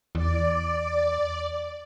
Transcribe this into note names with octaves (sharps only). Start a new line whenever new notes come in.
E2 D5